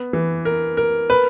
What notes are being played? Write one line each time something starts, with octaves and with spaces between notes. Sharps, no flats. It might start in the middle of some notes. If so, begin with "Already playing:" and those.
Already playing: B3
E3
A#4
A#4
B4